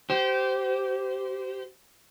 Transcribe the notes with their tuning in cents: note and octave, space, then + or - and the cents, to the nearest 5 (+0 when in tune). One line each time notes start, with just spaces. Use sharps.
G4 -25 C5 -10